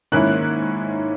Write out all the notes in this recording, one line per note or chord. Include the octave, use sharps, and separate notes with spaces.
G#2 D#3 A#3 C#4 E4 F#6